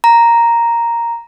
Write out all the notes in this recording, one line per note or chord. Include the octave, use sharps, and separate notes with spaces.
A#5